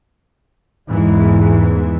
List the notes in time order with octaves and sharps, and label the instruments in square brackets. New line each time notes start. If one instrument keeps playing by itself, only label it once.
[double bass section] E2 G#2 E3 G#3